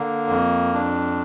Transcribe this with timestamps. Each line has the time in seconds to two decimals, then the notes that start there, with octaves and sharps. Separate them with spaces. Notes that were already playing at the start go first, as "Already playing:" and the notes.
Already playing: D3 A#3
0.28 F2
0.73 D4